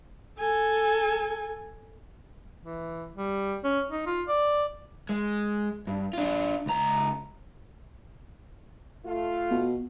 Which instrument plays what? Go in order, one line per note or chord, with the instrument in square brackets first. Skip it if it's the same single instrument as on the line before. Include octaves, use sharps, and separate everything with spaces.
[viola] A4 G#5
[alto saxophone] E3
G3
C#4
D#4
F4
D5
[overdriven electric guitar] G#3
G2
D4 F4
C#2 A#5
[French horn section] A3 F4
[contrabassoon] B2